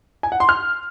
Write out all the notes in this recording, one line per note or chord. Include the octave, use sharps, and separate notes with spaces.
G#5
F#5
C6
F6